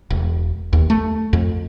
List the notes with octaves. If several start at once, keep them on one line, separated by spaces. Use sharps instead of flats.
E1
D#2
A3
F2